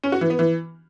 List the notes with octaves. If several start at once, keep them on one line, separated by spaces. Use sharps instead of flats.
C#4
F#4
E3
B3
E3